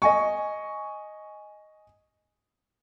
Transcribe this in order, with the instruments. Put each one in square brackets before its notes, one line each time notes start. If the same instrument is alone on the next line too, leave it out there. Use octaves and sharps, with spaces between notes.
[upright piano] D#5 G#5 C#6